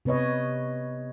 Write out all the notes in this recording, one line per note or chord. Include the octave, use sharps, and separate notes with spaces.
C3 B3 B4 C#5 D#5